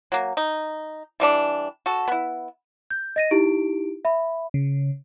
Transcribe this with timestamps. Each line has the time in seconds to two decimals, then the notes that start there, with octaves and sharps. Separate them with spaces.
0.12 F#3 A#3
0.37 D#4
1.20 E3 G3 D4
1.86 F#4 A4
2.08 B3 E4
2.91 G6
3.16 D#5 A#6 D#7
3.31 D#4 E4 G4 D7
4.05 E5 B5
4.54 C#3